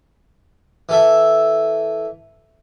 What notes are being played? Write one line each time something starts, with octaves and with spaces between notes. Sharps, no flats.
E3 A4 E5